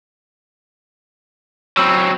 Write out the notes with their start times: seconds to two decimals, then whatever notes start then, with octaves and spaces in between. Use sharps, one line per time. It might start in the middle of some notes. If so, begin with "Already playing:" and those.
1.77 F#3 C4 B5 E6